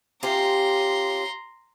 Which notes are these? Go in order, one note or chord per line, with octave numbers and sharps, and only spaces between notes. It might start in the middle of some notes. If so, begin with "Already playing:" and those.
C#4 F4 G4 A#5 C6